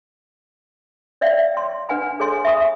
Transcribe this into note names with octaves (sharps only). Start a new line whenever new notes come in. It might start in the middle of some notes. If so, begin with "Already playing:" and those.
C#5 D5 E5 F5 G5
G5 C6
D4 B4 F#5 G#5 B5
G#4 A4 C#5 G#5 C6
E5 G#5 B5 C#6 D#6